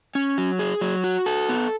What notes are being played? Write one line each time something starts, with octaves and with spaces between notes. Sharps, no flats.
C#4
F#3
G#4
F#3
F#4
A4
B3